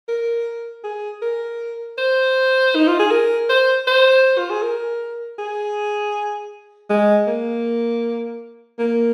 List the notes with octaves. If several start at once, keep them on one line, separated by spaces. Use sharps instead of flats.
A#4
G#4
A#4
C5
D#4
F4
G#4
A#4
C5
C5
F4
G#4
A#4
G#4
G#3
A#3
A#3